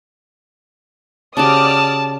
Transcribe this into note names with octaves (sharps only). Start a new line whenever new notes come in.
C#3 F#4 G4 D5 A5 D#6 F6